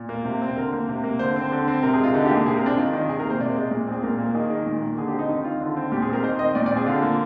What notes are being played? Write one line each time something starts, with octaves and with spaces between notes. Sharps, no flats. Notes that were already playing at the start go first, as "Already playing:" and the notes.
Already playing: A#2
A#3
C3
C4
D3 A#4
A#3
C3
A#3
D3 C5
C4
D3
C4
C3 A#4
G#4
G#3 F4
D3 D#4
G4
A#3
G#4
C3 G#4
A#4
C4 D4
D#3 F4
D#3
C3 G#4
A#4
A#3
C5
C3 D5
G#3
A#2
C4 G#4
A#2 A#4
A#3
D#3 G#4
D#3
A#2
A#3
D3 G#4
G4
C4
D#4
D#3 D#4
D#3 F4
D3
C4
A#2 G4
G#4
C4
A#4
D#3 C5
C4 D#5
A#2 D5
D5
C4
G#4
D3 F4
A#3